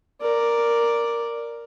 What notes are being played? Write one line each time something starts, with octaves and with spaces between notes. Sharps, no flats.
A#4 D5